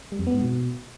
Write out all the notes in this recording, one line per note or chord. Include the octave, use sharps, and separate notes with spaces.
G3
F2
B3
G#2
B2